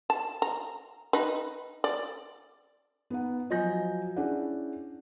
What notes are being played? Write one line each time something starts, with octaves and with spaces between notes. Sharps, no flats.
A5
A#5
D#4 B4
D5
B3 D#4 F#5
F3 F#3 D#5 G#5 G6 A#6
C#4 D4 E4 G#4 D5 F#5